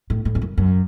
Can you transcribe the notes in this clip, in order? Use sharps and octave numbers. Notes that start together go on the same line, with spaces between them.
A2
A2
E2
F#2
F#2